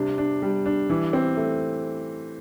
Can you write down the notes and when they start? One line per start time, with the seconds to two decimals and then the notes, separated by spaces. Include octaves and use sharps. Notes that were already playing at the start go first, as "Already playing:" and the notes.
Already playing: C3 G3 D4
0.18 D4
0.42 G3
0.66 D4
0.90 E3
1.13 C4
1.37 A3